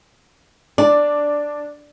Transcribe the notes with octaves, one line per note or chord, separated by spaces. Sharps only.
D4 D5